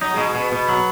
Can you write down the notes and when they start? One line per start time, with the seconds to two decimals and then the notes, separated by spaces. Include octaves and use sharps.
0.01 F#3 D#4
0.14 G#3
0.17 B2
0.26 G#3
0.35 B2 B3
0.52 B2 B3
0.69 F#3